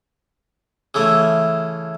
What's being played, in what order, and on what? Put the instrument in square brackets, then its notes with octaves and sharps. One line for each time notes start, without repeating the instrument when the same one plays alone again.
[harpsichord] C#3 E3 A3